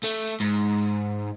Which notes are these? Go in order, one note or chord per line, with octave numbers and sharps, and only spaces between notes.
A3
G#2